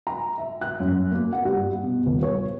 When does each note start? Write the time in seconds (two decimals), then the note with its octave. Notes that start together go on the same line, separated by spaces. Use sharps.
0.07 A#5
0.38 E5
0.61 F#6
0.80 F#2
1.12 A#3
1.33 F#5
1.45 G2
1.83 B2
2.06 D#1
2.23 C#5